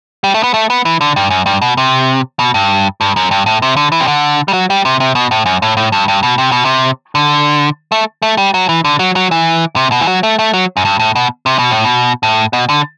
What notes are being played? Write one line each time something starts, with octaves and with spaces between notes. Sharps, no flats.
G3
A3
B3
A3
B3
E3
D3
G2
F#2
G2
B2
C3
B2
G2
G2
F#2
G2
A2
C3
D3
E3
C3
D3
G3
F#3
G3
C3
C3
B2
A2
F#2
A2
A2
G2
G2
B2
C3
B2
C3
D3
A3
A3
G3
F#3
E3
D3
F#3
F#3
E3
C3
B2
E3
F#3
A3
A3
F#3
F#2
G2
A2
B2
C3
B2
A2
B2
A2
B2
D3